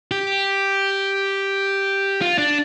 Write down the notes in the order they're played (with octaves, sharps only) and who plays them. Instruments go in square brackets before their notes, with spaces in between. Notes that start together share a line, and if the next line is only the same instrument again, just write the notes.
[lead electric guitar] G4
F4
D4